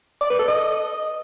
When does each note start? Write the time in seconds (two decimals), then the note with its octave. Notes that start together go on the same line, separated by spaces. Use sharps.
0.21 D5
0.30 B4
0.39 A4
0.48 D#5